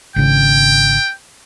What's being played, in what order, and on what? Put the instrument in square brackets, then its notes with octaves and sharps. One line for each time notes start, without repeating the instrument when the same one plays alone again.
[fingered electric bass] G#1 C#3 [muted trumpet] G5